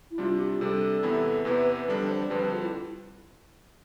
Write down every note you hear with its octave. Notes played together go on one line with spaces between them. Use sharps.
E4
C3 G3 D4 F4
G4
C3 G3 D4 A4
E2 C3 E3 B3 E4
E2 C3 E3 B3 E4 B4
B4
F2 D3 G3 D4 A4
C5
F2 D3 G3 D4 B4
A4
F4
E4